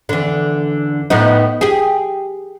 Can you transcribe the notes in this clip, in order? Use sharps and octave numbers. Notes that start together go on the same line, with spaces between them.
E2 D3
A2 B3 D#4
G4 G#4